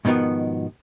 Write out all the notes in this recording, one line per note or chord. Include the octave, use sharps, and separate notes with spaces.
G#2 B2 D#3 F3 B3